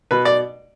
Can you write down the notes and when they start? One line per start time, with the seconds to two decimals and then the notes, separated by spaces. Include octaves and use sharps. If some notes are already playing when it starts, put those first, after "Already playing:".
0.11 B2 B4
0.25 D5